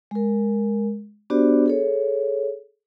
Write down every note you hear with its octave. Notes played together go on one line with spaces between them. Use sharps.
G#3 A#4
B3 D4 F#4 G4 C5 D5
G#4 A4 C#5